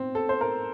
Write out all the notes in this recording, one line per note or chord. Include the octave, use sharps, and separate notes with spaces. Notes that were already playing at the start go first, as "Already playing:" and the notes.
Already playing: C4
A4
C5
A#4